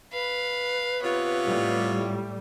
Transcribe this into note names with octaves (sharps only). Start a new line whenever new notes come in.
B4 F5 B5
C3 B3 F4 C#5
A2 G3